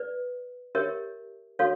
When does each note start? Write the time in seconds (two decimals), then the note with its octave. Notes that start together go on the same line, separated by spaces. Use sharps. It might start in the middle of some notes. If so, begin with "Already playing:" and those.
Already playing: B4 D5
0.75 G4 A#4 C#5 E5
1.59 F#4 A4 C#5 F5